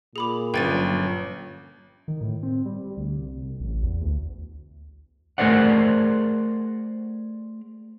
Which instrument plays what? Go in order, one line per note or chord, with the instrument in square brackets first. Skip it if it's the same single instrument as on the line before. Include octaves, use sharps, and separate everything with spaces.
[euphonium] A#2 [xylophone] G#4 B5 D6
[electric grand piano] G1 [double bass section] F3 F#3 C#4 [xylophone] G5 A6 D#7
[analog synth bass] D#3
A2
C4
G3
D2
C2
A1
E2
D2
[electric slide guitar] A3 G#4 A#4 C5 D5 F#5